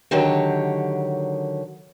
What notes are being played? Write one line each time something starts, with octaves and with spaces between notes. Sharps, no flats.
D3 D#3 F#3 G4 C#5